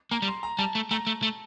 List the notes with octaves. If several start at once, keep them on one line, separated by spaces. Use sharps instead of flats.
A#3 A#5
G3
C6
A#5
G3 A5
A3
A3 A#5
A3
A3